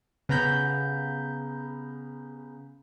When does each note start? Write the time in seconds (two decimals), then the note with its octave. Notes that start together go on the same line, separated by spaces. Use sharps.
0.29 C#3 B3 A#5 B5 G6